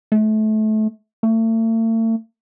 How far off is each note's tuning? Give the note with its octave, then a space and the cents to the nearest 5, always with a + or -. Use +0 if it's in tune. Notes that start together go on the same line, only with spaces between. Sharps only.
A3 -25
A3 +40